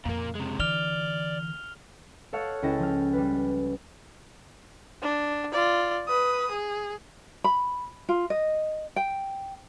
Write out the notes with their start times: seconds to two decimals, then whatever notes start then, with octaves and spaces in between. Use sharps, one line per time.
0.05 F2 A#2 C#3 A#3
0.35 C3 G#3
0.59 D3 E3 D5 F6 F7 G7
2.33 A4 C#5 F5 F#5
2.63 C#2 C#4 E4 A4 G5 A#6
2.79 F3 F6
3.13 G3 B4
5.02 D4
5.52 F4 D5
6.08 B4 D#6
6.51 G#4
7.44 B5
8.09 F4
8.30 D#5
8.96 G5